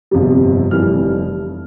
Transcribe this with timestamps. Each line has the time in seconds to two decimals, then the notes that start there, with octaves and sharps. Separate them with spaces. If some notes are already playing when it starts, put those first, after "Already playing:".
0.11 G1 F2 C3 G3
0.71 F1 F2 E3 G3 F6